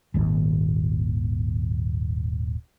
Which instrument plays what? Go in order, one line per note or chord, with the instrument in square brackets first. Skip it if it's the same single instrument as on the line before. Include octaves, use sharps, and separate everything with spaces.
[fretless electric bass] D#1 G#1 D#2